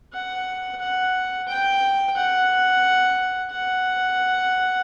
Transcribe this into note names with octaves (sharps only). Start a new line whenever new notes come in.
F#5
F#5
G5
F#5
F#5